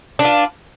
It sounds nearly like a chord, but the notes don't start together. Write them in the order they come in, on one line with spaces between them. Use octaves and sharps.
D4 B4 F4